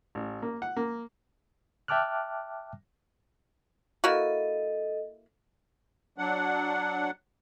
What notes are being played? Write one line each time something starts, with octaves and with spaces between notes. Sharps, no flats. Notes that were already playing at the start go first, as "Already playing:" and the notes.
A1
A#3
F#5
A#3
E5 G5 A5 D6 F6 F#6
A#3 E4 F#4 A4 D#5
F#3 D4 F#5